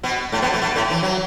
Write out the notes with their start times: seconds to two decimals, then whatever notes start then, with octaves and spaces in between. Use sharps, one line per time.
0.03 B2 B3
0.32 A2 A3
0.42 B2 B3
0.54 A3
0.62 B2 B3
0.76 A2 A3
0.90 E3
1.03 F#3